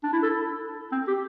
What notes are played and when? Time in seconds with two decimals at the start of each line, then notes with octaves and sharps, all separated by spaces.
0.04 D4
0.13 E4
0.23 A4
0.92 C4
1.08 G4